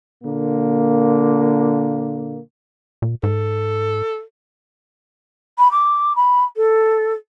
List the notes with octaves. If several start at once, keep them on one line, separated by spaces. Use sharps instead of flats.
A#2 D3 A#3
A#2
G#2 A4
B5
D6
B5
A4